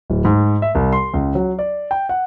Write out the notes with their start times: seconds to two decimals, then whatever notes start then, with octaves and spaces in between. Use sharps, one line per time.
0.10 D1
0.25 G#2
0.62 E5
0.75 C2
0.93 C6
1.14 C#2
1.35 F#3
1.59 D5
1.91 G5
2.09 F#5